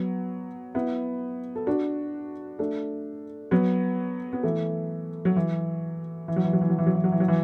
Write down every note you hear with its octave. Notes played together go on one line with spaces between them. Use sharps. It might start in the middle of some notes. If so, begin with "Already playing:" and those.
Already playing: F#3 B3
B3 E4
A4
D4 F#4
A3 D4
F#3 B3
B3
E3 A3
F#3
E3
E3
F#3
E3
F#3
E3
F#3
E3
F#3
E3
F#3
E3
F#3
E3